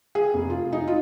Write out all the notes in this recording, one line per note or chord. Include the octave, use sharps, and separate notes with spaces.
G#4
F1
F4
D#4
F4